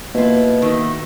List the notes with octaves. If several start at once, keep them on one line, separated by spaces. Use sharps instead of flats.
B2 A#3 E4 F4
D#3 A3